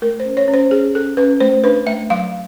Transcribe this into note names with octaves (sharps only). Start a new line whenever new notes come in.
A3 A#4
C5
C#4
C#5
C#4
C5
C#4 G#4
C#4 A4
C#4 B4
A3 C5
D4 B4
A3 E5
F#3 F5